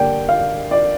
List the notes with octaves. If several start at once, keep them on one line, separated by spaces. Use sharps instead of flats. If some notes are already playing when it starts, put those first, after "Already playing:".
Already playing: G2 D3 A#3 D4 G5
F5
D5